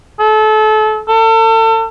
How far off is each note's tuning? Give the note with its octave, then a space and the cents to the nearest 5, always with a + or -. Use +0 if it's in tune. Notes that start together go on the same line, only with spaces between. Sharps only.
A4 -30
A4 +35